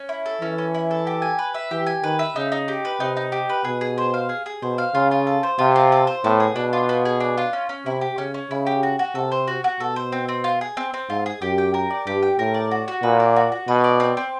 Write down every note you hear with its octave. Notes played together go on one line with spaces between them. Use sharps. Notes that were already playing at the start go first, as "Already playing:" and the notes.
Already playing: C#4
E4
A4
E3 C#4
C#4
E4
A4
G4
G#5
B4
E5
E3 G4
G#5
D#3 B4
E5
C#3 D#4
D#4
G4
B4
C3 D#4
D#4
G4
B4
B2 G#4
G#4
C5
F5
G#4
G#4
B2 C5
F5
C#3 F4
F4
A4
C5
C3 F4
F4
A4
C5
A2 B3
G#4
B2 D4
F4
B3
G#4
D4
F4
C#4
C#4
C3 E4
G4
C#3 C#4
C#4
C#3 E4
G4
F#4
F#4
C3 A4
C5
F#4
F#4
B2 A4
C5
C4
C4
F4
G#4
C4
C4
G#2 F4
G#4
F#2 G4
G5
A#4
D5
G2 G4
G5
A2 A#4
D5
F#4
F#4
A#2 B4
D5
F#4
F#4
B2 B4
D5
C4
C4